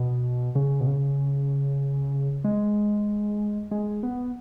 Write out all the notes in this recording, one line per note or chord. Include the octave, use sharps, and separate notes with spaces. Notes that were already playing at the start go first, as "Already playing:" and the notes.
Already playing: B2
C#3
B2
C#3
G#3
G#3
B3